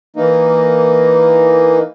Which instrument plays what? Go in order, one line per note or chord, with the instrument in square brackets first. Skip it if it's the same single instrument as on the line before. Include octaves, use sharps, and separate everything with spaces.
[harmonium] E3 A#3 D#4